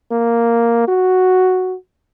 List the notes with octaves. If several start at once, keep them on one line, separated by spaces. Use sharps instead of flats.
A#3
F#4